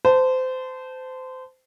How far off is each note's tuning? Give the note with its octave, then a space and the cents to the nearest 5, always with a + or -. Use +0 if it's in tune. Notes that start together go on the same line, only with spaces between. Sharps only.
C5 -25 A5 +0